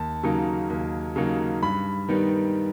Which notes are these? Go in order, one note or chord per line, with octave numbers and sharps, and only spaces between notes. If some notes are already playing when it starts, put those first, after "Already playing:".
Already playing: D#2 A5
C#3 F#3 A#3 D#4
D#2
C#3 F#3 A#3 D#4
G2 B5
D#3 G3 B3 D#4